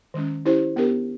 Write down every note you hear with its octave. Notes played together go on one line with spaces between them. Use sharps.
D#3 G#3 C#4
C#4 E4 G4 C5
B3 D4 G4 A#4